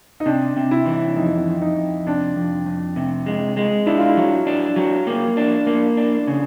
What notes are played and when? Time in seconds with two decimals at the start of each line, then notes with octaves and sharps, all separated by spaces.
0.20 D#4
0.26 C3 D4
0.57 C3
0.71 E4
0.86 E3
1.17 F2 D#4
1.46 F2
1.61 D#4
1.77 F2
2.07 C3 D4
2.36 F2
2.66 F2
2.96 C3
3.26 G#3
3.57 G#3
3.86 D4 E4
3.98 F4
4.09 E4
4.17 F#3
4.47 D4
4.76 F#3
5.07 A#3
5.37 D4
5.67 A#3
5.97 D4
6.27 C#3